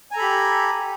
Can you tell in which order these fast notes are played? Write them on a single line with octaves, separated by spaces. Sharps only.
G#5 A#5 A4 B5 G4